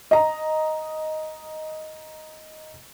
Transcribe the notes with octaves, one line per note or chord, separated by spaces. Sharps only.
D#5 A#5